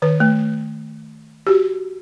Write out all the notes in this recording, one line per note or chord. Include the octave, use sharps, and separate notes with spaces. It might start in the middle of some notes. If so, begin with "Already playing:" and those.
D#3 B4
A3
F#4 G4